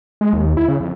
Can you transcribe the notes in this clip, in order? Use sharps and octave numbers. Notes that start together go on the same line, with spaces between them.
G#3
D#2
E4
C#3
F2